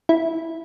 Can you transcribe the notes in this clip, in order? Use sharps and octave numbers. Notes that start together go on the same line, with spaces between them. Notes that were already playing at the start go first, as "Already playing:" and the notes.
E4